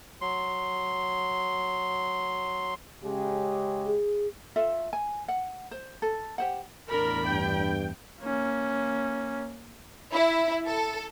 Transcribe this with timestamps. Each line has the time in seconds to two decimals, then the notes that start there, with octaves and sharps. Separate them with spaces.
0.21 F#3 C6
3.04 C#3 G#3 G4
3.86 G#4
4.56 F4 A4 E5
4.93 G#5
5.28 F#5
5.71 C5
6.02 A4
6.38 G4 C5 F#5
6.89 E2 A2 D4 A#4 B5
7.26 G2 G5
8.22 A#3 C#4
10.13 E4
10.67 A4